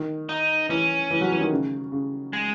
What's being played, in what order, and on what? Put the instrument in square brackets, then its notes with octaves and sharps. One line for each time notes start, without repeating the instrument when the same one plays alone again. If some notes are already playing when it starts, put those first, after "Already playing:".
Already playing: [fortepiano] D#3
[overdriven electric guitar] D#4
[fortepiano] E3 [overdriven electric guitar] C#4
[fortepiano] E3
F#3
E3
D#3
C#3
C#3
[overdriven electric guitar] G#3